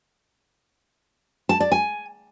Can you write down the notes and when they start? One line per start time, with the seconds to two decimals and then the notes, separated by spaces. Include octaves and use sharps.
1.49 A5
1.60 D5
1.72 G#5